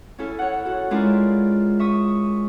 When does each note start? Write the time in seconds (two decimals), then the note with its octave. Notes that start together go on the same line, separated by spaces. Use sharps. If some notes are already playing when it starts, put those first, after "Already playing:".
0.18 C#4 E4 A4
0.39 C#5 F#5
0.65 F#4 A4
0.91 G#3 C#4 E4 F4 A#4 D5
1.79 E5 C#6 D#6